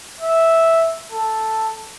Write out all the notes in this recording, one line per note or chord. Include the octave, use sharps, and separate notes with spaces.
E5
A4